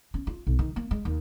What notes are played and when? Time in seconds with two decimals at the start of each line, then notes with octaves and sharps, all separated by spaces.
0.14 C#4
0.27 F4
0.47 B1
0.59 D#3
0.76 A#3
0.91 G#3
1.05 D#2